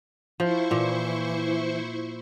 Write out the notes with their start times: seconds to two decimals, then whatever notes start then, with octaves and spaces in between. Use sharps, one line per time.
0.40 F3 E4 C5 C#6
0.71 A#2 E3